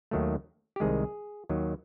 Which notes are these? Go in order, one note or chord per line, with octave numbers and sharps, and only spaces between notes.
D#2 D#3 F#3 A3
G4
C2 C3 D#3 G#3 G#4
D#2 D#3 F#3